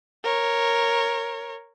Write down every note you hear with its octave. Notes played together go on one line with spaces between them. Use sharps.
A#4 C#5